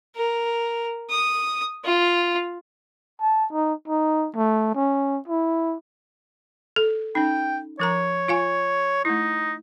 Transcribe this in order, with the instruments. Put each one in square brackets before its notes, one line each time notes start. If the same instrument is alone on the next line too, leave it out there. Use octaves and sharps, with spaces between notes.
[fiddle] A#4
D#6
F4
[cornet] A5
D#4
D#4
A3
C#4
E4
[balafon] A4
[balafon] C#4 D#4 [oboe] G5
[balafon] F3 A#4 A#5 [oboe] C#5
[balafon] F4 F5 G#5
[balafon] A3 E4 [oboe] D#4